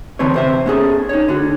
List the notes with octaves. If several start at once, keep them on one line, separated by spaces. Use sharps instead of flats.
D3 E3 C4 B4 C#5
C3 C5 E5
B3 C#4 G#4 A4
D#4 C#5
D3 F#4